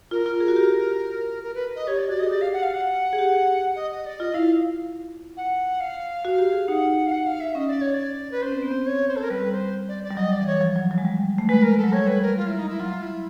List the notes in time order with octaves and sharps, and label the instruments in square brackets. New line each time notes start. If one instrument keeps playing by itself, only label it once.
[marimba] F4 [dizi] A#4
[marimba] F4
G#4
F#4
G4
[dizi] A#4
B4
D#5
[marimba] G4 [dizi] C#5
[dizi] D5
[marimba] F#4 [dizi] D5
[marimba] G#4 [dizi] D#5
[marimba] G4 [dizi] D5
[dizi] F5
F#5
F5
F#5
[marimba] G#4
G4
[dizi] D#5
D#5
D5
[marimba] F4 [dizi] D#5
[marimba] E4 [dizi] F5
[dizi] F#5
F5
[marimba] F#4
G4
G#4
[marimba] D#4 [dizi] F#5
[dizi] F5
F#5
F5
E5
[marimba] C#4 [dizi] D#5
[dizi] D5
C#5
D5
B4
[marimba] C#4 [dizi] C5
[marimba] C4
B3
C4
[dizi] C#5
C5
A4
A#4
[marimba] G3 [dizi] B4
[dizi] C5
D5
D5
[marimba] G3
[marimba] F#3 [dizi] D#5
[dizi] D5
[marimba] E3
[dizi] C#5
[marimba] F3
F#3
F#3
G#3
G3
A3
[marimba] G#3 [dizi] B4
[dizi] A#4
A4
[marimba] F#3
[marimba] G3 [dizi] C#5
[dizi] B4
A#4
F4
E4
D#4
E4
[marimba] F#3 [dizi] F4
[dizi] E4